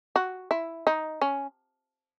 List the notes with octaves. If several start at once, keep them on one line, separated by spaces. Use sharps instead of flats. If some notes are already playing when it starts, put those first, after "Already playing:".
F#4
E4
D#4
C#4